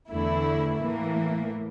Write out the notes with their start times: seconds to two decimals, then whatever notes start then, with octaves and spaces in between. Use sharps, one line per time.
0.11 E2 D3 A3 E4
0.81 A2 E3 A#3